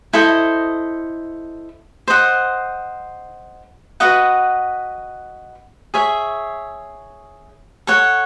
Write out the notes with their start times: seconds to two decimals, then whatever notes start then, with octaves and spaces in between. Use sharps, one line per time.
0.13 E4 A4 C5 D#5
2.08 C5 D#5 F#5
4.00 F#4 B4 D#5 F#5
5.94 G#4 C#5 E5
7.87 A4 C#5 F#5